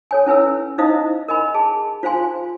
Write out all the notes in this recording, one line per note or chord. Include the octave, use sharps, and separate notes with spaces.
A4 C#5 G#5
C#4 E4 B4 G#5 E6
D#4 E4 C5 D#5 F5 D#6
A#4 D#5 G#5 B5
G#4 A5
F4 C5 F5 G#5 C6